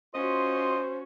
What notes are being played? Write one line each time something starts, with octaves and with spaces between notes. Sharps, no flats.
C#4 F4 F#4 C5 D#5 C6